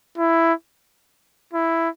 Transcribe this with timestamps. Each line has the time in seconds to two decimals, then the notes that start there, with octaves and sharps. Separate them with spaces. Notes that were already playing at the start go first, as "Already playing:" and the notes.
0.18 E4
1.54 E4